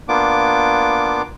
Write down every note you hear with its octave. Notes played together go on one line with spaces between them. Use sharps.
A#3 B3 D4 F4 D6